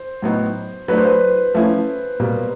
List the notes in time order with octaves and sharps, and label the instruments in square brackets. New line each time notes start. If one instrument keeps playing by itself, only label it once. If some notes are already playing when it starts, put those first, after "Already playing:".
Already playing: [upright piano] C5
[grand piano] A2 F#3 B3 D#4
[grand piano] F#3 A3 D4 [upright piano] B4
[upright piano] C5
B4
[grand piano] F3 A3 C#4 E4
B2 G3 A#3